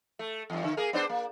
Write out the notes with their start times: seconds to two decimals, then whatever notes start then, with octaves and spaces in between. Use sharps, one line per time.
0.19 A3
0.50 E2 G2
0.64 D3
0.77 A#3 G#4 A#4
0.93 B3 D4 C5
1.09 A#3